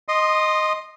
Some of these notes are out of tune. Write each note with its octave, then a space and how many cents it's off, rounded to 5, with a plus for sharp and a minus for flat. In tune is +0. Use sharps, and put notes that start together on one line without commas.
D#5 +0 C6 +0 D#6 -20